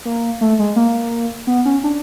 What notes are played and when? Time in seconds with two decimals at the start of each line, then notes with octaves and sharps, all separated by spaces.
0.05 A#3
0.41 A3
0.59 G#3
0.76 A#3
1.47 B3
1.65 C#4
1.84 D4